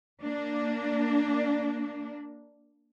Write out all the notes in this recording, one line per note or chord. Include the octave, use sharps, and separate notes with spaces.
A#3 D4